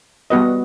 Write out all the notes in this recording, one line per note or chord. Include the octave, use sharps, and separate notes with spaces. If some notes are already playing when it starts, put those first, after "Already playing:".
G3 B3 F#4 B4 D#5